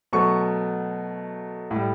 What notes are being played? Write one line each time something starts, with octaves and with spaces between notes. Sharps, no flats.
B2 F#3 A3 C#6
A2
G3